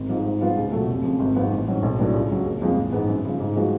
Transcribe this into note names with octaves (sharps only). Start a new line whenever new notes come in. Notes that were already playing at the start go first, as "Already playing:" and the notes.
Already playing: G#1
G#2 F3
G#2
F3 B3 F4
C#2
B2 F#3 A3
F1
F2 C#3
G#1
G#2 F3 B3 F4
A1
G#2 F#3 C#4 F#4
B1
A2 F#3 B3 D4
C#2
C#3 F#3
F#1
F2 F3 G#3
A1
G#2 G#3 B3
F#2
C#3 F3
G#2
F3 G#3 B3 F#4